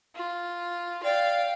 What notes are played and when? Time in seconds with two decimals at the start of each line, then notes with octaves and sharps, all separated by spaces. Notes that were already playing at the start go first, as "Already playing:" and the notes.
0.15 F4
1.04 D5 F5 G5